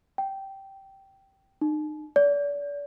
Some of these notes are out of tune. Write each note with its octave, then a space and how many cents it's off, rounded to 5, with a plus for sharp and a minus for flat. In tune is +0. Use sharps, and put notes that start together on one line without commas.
G5 -10
D#4 -35
D5 -35